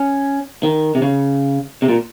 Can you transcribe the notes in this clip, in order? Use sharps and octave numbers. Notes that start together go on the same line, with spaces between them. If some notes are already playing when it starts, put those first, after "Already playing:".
Already playing: C#4
D#3
C3
C#3
C3
A#2